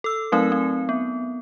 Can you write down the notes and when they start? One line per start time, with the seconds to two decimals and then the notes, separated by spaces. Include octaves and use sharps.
0.04 A4 E6
0.32 F#3 A3 C4 D#4 A#4
0.52 C4
0.89 B3